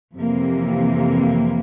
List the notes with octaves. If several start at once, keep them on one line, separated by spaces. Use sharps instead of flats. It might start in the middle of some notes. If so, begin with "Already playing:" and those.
F2 C3 E3 A#3